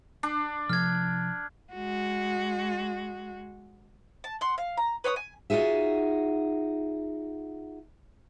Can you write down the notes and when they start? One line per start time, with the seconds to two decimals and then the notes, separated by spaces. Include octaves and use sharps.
0.23 D4
0.70 C3 F3 F6 G#6
1.73 G#3 F#4
4.24 A5
4.41 F#5 C6
4.58 F5
4.77 A#5
5.04 B4 C#5 C6 D#6
5.16 G#5
5.50 D#4 F4 F#4 G#4 E5